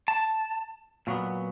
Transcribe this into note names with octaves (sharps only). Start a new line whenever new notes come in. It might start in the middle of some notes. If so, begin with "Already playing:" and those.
A5
A#2 F#3 B3